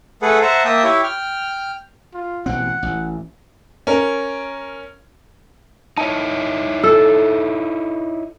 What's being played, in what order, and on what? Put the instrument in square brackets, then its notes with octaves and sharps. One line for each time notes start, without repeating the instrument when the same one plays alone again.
[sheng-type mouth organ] A3 G#4 A4 B4 F#5
C5 E5 F#5 A5 A#5
A#3 E5 G5 A5 D#6
E4 G4 C#5 E5
G5 F6
[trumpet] F4
[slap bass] A1 B2 C4 [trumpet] F#5
[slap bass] A1
[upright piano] C#4 A#4
[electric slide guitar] D#4 E4 C#5 [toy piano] A5
[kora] A4 [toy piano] E6